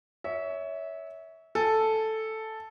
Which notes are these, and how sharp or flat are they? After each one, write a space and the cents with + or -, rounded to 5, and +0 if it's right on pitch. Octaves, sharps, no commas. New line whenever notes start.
C#5 +20 E5 -20
A4 +0 G#5 +0